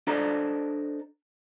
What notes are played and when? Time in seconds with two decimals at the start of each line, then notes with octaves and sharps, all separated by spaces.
0.07 D4 A4 C5 D5 D#5 A#5